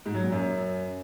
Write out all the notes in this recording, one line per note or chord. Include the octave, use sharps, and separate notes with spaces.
G#2
F#3
A#2
F#2